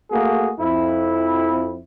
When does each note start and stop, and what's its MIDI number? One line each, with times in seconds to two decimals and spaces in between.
0.11 0.52 57
0.11 0.52 58
0.11 0.52 66
0.11 0.52 68
0.60 1.79 41
0.60 1.79 64